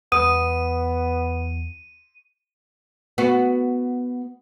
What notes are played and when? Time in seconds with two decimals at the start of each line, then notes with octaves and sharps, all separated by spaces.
0.12 E2 B3 D#6 D#7
3.18 B3 F#4